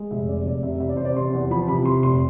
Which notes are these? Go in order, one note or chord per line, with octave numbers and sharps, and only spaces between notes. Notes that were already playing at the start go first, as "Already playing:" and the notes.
Already playing: G#3
F1 E5
C3 D5
F1 D5
C3 E5
E2 E5
D5
C3 C5
D5
C3 C6
E2
F3 B5
C3 B5
C3 C6
F1 C6